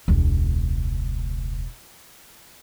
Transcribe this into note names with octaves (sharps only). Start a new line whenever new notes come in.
E1 C#2